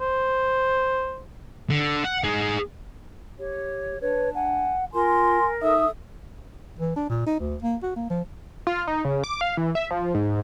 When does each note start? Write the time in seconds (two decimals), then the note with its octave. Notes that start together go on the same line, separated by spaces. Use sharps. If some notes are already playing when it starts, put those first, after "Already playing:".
0.01 C5
1.70 D3
2.04 F#5
2.24 D#4 G#4
3.39 G4 C#5
4.01 D4 B4 C#5
4.35 F#5 G#5
4.94 F4 A#4 G#5 C6
5.62 D#4 A4 E5 D#6
6.79 E3
6.96 D4
7.09 A#2
7.26 D#4
7.40 D2
7.63 A#3
7.83 F#4
7.96 A#3
8.10 F3
8.67 F4
8.87 D#4
9.05 C#3
9.24 D6
9.41 F5
9.57 E3
9.75 E5
9.91 F3
10.15 G#2